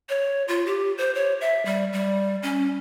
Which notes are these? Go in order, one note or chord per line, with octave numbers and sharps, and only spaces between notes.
C#5
F4
G4
C5
C#5
E5
G3
G3
C#4